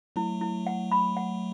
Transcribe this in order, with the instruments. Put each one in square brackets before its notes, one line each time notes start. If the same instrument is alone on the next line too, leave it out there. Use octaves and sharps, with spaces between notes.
[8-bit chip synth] F#3 A3 [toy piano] E4
[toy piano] E4
F#5
B5
F#5